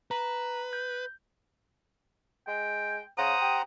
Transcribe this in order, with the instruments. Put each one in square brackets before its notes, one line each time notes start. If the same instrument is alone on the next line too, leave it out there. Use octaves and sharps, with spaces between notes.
[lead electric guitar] B4 [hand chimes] A#5
[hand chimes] G6
[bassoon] G#3 [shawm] G5
[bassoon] C#3 [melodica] C5 F#5 A#5 [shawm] D#6
[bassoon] G4